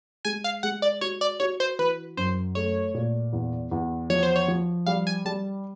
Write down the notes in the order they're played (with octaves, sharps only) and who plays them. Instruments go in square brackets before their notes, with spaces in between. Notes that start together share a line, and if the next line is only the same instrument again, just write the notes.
[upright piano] G#3 [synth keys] G#5
[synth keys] F5
[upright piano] G#3 [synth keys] F#5
[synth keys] D5
[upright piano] F#4 [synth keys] C#5
[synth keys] D5
[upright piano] F#4 [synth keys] C#5
[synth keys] C5
[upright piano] E3 [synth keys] B4
[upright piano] F#2 [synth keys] C5
[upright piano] A3 [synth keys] C#5
[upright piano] A#2
E2
E2
[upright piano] F3 [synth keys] C#5
[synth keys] C5
C#5
[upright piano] F3
[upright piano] G3 [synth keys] F5
[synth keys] G#5
[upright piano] G3 [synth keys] A5